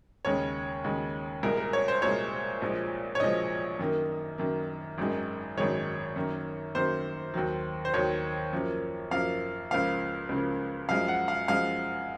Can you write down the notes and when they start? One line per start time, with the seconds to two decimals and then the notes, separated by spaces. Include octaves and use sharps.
0.25 D#2 C#3 G#3 C#5
0.84 D#2 C#3 G#3
1.43 C2 A#2 G#3 A#4
1.57 A#4
1.73 C#5
1.88 C5
2.02 C2 A#2 G#3 C#5
2.62 A#1 A#2 F3 G#3
3.15 C#5
3.20 A#1 A#2 F3 G#3 D#5
3.79 F#2 D#3 A#3
4.38 F#2 D#3 A#3
4.98 G#1 F#2 D#3 G#3
5.58 G#1 F#2 D#3 G#3 C#5
6.16 F#2 D#3 A#3
6.75 F#2 D#3 A#3 C5
7.34 D#2 D#3 F#3
7.85 C5
7.94 D#2 D#3 F#3 C#5
8.53 F#2 F3 A#3
9.11 F#2 F3 A#3 F5
9.71 C#2 C#3 F3 A#3 F5
10.29 C#2 C#3 F3 A#3
10.89 F#2 F3 G#3 F5
11.08 F#5
11.28 F5
11.48 F#2 F3 G#3 F5